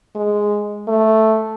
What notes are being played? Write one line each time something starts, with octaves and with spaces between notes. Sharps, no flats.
G#3
A3